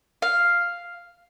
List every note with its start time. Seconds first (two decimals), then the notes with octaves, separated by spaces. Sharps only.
0.22 F5